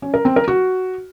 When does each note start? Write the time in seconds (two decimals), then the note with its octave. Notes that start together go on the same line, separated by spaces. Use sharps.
0.02 C#4
0.14 A#4
0.25 C4
0.36 A#4
0.48 F#4